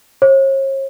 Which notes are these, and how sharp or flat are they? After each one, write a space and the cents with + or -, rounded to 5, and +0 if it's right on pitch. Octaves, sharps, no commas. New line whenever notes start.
C#5 -45